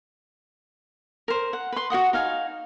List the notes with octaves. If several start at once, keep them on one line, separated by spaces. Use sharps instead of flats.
A#4 C5
F#5
B4 C6
F#4 C5 F#5 D#6
D#4 F5 G#5